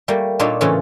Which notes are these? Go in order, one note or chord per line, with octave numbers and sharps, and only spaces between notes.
G3 A3 A#3
A#2 D4 D#4 F4 A4 C#5
A2 C#3 E3 C#4 F4 A4